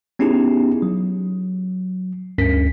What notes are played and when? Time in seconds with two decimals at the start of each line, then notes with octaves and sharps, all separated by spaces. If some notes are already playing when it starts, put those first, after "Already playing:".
0.19 B3 C#4 D#4 E4 G4 G#4
0.82 F#3
2.38 D2 G2 C#4 A#4 B6